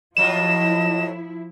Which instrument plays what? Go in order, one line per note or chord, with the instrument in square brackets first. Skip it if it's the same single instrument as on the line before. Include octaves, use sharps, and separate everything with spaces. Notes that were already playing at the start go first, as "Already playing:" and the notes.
[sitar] A2 F#3 F4 [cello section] F3 E4 [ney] D#5 [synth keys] E7